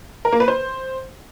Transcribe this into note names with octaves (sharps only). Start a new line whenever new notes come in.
A#4
A#3
B4
C5